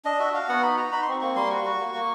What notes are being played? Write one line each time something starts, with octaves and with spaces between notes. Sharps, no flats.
D4 D#5
F#4 E5
F#4 F5
B3 F#5
D#4 B5
F#4 A#5
D#4 B5
C6
C4 C#6
A#3 C#6
G3 C6
F#4 C#6
F#4
A#3
A#3